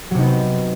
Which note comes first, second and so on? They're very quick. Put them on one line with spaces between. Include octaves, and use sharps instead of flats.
F#3 C3 D#4 B3 C4